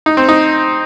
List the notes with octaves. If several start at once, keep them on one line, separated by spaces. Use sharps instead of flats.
D#4
C4
D#4